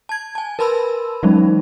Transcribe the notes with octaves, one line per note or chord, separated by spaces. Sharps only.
A5 G#6
G#5 A5
A#4 B4 A5 B5 C6 E6
E3 F#3 G#3 C#4 D#4